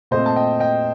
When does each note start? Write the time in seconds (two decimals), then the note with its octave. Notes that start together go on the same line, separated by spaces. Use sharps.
0.11 A#2 A3 C4 C5 D#5
0.26 A5
0.36 D#5 G5
0.60 D#5 G5